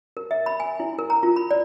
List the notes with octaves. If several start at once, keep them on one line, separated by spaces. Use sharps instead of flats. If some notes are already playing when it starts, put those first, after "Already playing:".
A#4
E5
B5
G#5
E4
A#4
A#5
F4
B5
D5